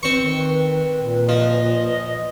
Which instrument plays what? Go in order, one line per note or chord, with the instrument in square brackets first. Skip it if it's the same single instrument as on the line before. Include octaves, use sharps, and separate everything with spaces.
[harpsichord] C4 C#6 [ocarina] B4
[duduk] D#3
A#2
[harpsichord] F3 [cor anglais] D#5